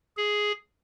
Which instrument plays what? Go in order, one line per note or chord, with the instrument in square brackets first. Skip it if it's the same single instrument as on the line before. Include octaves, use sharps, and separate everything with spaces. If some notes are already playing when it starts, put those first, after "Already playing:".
[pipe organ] G#4